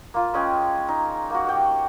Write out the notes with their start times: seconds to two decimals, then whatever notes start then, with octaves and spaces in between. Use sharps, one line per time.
0.14 A#3 F4
0.34 G#3 C#4 G#4 G5
0.89 D#4
1.30 A#3 F#4
1.46 F#4 G4 G5